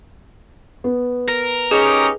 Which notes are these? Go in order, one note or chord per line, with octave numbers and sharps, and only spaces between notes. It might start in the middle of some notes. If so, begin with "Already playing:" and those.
B3
A#4 A#6
C#4 D#4 G4 G#4